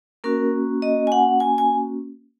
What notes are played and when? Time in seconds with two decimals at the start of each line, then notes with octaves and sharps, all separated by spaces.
0.24 A#3 C#4 F#4 A#4
0.82 D#5
1.07 G#5
1.12 F#5
1.40 G#5
1.58 G#5